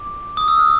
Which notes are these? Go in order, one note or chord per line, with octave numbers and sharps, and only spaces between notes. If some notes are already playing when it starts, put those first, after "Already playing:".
Already playing: D6
D#6
E6
F6